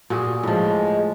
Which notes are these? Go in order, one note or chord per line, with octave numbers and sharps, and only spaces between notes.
A#2 F#4 G#4
A2 F3 G#3